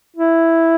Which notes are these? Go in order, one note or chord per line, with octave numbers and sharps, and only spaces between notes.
E4